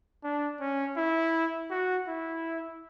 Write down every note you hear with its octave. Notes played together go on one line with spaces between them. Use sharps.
D4
C#4
E4
F#4
E4